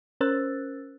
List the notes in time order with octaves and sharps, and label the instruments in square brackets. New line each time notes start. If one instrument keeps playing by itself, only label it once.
[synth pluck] C#4 A#4 C5 E6 F#6 A6